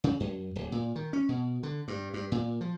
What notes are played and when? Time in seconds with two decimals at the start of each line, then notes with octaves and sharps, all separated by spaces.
0.04 C#3
0.20 F#2
0.56 D1
0.72 A#2
0.96 D#3
1.13 C#4
1.29 B2
1.63 D3
1.88 G2
2.14 G2
2.32 A#2
2.61 F3